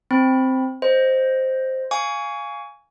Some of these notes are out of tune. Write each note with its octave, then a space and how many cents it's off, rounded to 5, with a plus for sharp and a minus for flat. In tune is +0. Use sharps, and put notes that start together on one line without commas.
C4 +0 B5 +0
C5 +0 D#5 +0
F5 +0 G#5 -5 C#6 +30